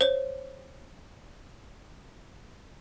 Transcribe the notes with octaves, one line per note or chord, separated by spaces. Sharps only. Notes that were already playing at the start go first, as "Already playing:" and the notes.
C5 C#5